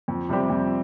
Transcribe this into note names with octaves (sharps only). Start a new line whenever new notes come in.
F2
C3 G3 C4 G4
F2